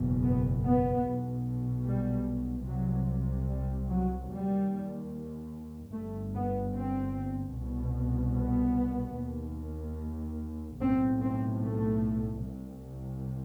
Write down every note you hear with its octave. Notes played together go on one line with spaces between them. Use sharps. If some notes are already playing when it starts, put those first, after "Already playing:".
Already playing: F#1 E2 B2
B3
B3
B1 B2
G3
C2 C3 F#3
G3
F#3
D#2 G3
G1 G2 A3
B3
C4
C2 B2
B3
D#2
B1 A2 C4
C4
A3
C2 C3